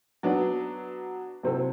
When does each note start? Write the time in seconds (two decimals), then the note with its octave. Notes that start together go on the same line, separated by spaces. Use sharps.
0.23 F#3 B3 D4
1.43 C3 F#3 C4 E4 A4